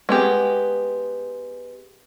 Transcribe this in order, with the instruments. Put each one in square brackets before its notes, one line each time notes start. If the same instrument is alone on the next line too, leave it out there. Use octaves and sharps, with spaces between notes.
[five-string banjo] G#3 B3 G4